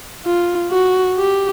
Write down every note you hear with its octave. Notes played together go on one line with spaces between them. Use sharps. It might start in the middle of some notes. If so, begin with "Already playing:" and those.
F4
F#4
G4